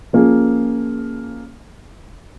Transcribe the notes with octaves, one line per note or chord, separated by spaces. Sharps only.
F3 A#3 C#4 G#4